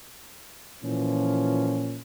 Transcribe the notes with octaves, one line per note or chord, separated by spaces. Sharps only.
A#2 E3 F3 C#4